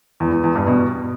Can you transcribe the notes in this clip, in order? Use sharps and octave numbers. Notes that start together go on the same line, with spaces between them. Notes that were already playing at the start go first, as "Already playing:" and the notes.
E2
E2
E2
G2
B2